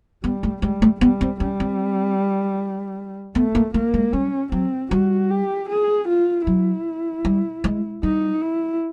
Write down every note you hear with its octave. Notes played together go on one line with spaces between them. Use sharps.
G3 B3
A3
G3 G#3
A3
G3 B3
C4
G3 C#4
C4
A3 B3
A#3
A3 A#3
G#3
G3 C#4
F#3 C4
G3 F#4
G4
G#4
F4
F#3 E4
G3
G#3
G3 D#4
E4